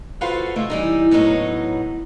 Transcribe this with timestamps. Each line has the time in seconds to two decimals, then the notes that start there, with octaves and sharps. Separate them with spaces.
0.21 F4 F#4 A4 B4 C5 F5
0.56 C3 D#3 A3 E4
0.70 E3 G3 D#4
1.11 A2 F#3 B3 D#4 C#5